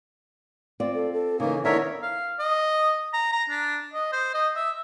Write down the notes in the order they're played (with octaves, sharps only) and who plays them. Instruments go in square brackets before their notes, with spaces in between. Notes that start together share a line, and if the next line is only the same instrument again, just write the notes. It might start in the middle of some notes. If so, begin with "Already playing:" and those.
[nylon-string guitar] C4 F4 D5
[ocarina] A4
A4
[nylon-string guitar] C#3 E3 [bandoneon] A#3 [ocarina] D#4
[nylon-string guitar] D3 D#3 B3 [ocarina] E4 [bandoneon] A#4 C#5 E5
[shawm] F5
D#5
A#5
A#5
D4
D#5
C5
D#5
E5